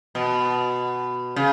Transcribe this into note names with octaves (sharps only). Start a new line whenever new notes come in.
B2
C#3